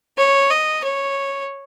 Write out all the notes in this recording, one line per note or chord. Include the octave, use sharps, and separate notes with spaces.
C#5
D#5
C#5